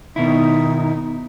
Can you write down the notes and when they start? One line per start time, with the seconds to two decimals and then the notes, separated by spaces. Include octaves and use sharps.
0.16 B2 D#3 D#4 E4